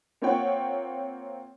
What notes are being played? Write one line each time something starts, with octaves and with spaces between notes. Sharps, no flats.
A#3 C4 F4 C#5 F#5 G5